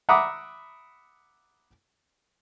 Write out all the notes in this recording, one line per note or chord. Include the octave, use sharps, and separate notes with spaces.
E5 F#5 A#5 B5 D6 D#6